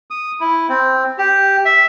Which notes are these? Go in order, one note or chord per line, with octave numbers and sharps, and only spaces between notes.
D#6
E4
C4
G4
E5